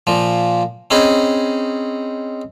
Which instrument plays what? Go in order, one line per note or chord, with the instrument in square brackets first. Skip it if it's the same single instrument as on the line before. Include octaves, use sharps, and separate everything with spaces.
[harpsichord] A#2 F3
C4 C#4 D#4 G#4 B5